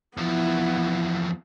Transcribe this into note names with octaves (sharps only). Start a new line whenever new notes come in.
E2 F3 B3 E4